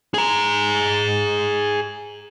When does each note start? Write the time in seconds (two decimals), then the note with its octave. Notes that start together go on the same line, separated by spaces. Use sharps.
0.14 G#4 A#5